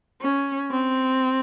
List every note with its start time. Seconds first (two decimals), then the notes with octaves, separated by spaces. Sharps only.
0.22 C#4
0.71 C4